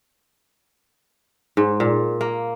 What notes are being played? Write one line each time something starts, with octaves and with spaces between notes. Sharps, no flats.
G#2
A#2
A#3